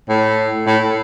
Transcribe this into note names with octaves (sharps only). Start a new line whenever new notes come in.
A2
A2